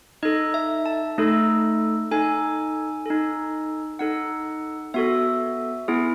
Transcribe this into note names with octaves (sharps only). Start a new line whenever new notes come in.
D#4 A4 D#5
E5
A5
A3 D#4 A4
D#4 A4 G#5
D#4 A4
D#4 A4 F#5
B3 F#4 A4 E5
B3 E4 G#4